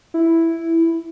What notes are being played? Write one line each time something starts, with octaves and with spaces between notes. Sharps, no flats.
E4